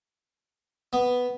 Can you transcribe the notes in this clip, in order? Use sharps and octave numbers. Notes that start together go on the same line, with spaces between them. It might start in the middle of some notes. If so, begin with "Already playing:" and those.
B3